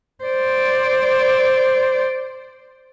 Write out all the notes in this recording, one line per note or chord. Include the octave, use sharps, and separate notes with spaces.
C5 D5